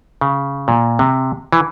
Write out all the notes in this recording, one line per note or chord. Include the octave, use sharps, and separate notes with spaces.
C#3
A#2
C3
E3